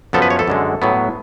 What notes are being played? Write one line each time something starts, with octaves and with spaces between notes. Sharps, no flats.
F#2 F3 B3 A4
B4
C#5
A4
F#2 D3 G#3
A2 F#3 B3